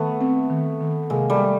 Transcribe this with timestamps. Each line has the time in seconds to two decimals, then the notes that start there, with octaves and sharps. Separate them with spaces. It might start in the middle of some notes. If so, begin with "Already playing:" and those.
Already playing: D#3 A3 B3
0.21 C4
0.50 D#3
0.81 D#3
1.10 C3 G#3 A#3
1.30 G3 A3